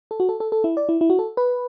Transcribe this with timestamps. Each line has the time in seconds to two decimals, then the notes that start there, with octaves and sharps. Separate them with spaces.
0.11 A4
0.20 F#4
0.29 A4
0.40 A4
0.52 A4
0.64 E4
0.77 D5
0.89 E4
1.01 E4
1.10 F#4
1.19 A4
1.37 B4